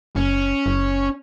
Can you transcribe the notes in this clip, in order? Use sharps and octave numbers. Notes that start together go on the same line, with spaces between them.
F#1 C#4
F#1